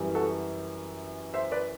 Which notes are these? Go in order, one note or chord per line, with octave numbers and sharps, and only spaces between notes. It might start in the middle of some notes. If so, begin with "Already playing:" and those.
Already playing: F#2 E3 G3
F#4 A4
C5 E5
B4 D5